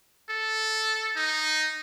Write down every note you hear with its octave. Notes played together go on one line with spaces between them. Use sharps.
A4
D#4